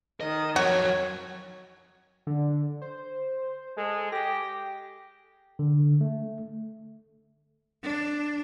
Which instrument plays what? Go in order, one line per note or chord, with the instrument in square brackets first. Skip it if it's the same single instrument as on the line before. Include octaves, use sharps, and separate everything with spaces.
[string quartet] D#3 [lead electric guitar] D#5
[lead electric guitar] F2 F#3 [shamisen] F#4 [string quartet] C#5
[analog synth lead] D3
C5
[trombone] G#3 [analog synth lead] A4
[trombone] G4 [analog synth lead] A#6
[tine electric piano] D3
A3
[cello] D4